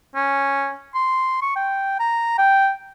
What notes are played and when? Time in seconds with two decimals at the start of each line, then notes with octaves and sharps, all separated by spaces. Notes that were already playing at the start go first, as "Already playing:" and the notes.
0.15 C#4
0.95 C6
1.42 C#6
1.56 G5
2.00 A#5
2.38 G5